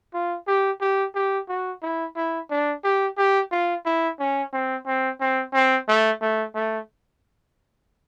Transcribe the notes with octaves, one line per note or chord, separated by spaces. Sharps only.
F4
G4
G4
G4
F#4
E4
E4
D4
G4
G4
F4
E4
C#4
C4
C4
C4
C4
A3
A3
A3